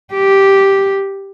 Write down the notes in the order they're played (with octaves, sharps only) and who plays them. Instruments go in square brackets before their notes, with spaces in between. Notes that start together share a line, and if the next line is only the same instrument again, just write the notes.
[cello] G4